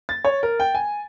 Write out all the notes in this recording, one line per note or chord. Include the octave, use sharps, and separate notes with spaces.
A6
C#5
A#4
G5
G#5